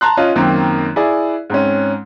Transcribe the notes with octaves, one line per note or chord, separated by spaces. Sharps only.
A5 A#5 C6 F#6
C#4 F4 D#5
F#2 D#3 A#3 C4
E4 G#4 D5
G#2 C4 C#4